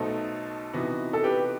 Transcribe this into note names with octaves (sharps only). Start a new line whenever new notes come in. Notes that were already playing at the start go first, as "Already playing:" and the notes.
Already playing: B1 B2 A3 D#4 A4 C5
C3 E3 B3 D#4 F#4
A4
G4 B4